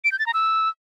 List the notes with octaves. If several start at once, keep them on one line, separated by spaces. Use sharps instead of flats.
D7
G6
A6
A#5
E6